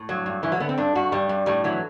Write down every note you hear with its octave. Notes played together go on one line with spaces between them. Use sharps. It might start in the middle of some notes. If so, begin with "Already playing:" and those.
Already playing: A2
G2 F#3
G2
G2 E3
F#3
D3 B3
C4
G2 D4
G2 F#4
G2 G3
G2
A2 G3
E3 F#3